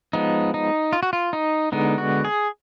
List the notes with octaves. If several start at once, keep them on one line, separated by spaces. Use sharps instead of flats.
F3 G#3 B3 D#4
D#4
F4
F#4
F4
D#4
D3 G#3 B3 D#4
F#4
G#4